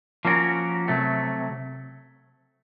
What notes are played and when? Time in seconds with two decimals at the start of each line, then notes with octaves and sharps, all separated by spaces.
0.25 F3 A#3 C#4 F#4 A#4
0.88 C3 F#3 A3